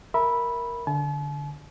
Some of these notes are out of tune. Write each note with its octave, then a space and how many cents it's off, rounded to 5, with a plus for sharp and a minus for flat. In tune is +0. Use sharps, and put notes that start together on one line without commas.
A#4 +0 E5 +0 B5 -10
D3 -15 A5 -45